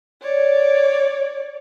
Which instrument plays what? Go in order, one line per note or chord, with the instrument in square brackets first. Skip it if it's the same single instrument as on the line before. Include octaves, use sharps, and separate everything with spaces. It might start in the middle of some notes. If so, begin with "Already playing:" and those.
[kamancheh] C#5 D5